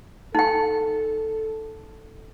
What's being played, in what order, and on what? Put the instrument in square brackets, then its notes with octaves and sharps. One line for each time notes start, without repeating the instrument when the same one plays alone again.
[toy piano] D#4 G5 [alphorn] A4